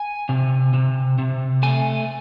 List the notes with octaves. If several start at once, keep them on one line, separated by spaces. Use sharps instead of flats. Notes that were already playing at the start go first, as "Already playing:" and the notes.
Already playing: G#5
C3
C3
C3
A3 G#5